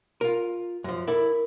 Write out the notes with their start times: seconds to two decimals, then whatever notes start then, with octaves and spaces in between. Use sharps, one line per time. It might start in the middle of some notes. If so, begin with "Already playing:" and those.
0.21 F4 A#4
0.84 F#2 F3
1.08 E4 A4 A#4 D5